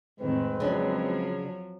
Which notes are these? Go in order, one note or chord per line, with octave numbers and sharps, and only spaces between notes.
F2 A2 D#3 G#3 C4 B4
C#3 F3 F#3 D4